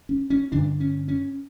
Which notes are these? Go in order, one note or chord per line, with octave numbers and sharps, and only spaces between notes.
C#4
C#4
G2 D3 D4
C#4
C#4